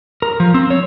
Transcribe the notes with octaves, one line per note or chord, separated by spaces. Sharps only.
A#4
F3
C4
C#5